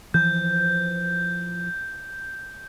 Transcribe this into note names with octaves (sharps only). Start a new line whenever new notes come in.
E3 F3 G6